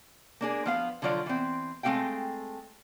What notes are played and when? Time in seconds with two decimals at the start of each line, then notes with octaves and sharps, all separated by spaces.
0.41 A#3 D4 G#4
0.66 F3 B3 F5
1.02 D3 F3 F#3 F4 D5
1.26 E3 C4
1.83 G#3 A3 C4 G#4 F5 G5